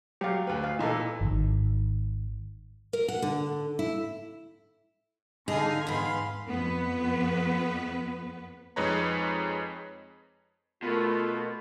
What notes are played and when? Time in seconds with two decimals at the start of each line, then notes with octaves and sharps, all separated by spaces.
0.21 F#3 G4 F5
0.47 D2 B4
0.64 F5
0.79 A#2 E3 D#4 A4
1.21 G#1 D#3
2.93 A#4
3.08 F#5
3.22 D3
3.79 E4
5.48 D3 D#4 G#4 F5 G#5
5.87 E2 G#2 F5 B5 C6
6.47 F2 B3 B4
8.76 F2 G#3 D#4 B4 C#5 A#5
10.83 B2 A3 F4 A#4 B4